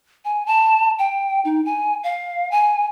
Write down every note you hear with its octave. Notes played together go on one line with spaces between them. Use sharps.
G#5
A5
G5
D#4
G#5
F5
G#5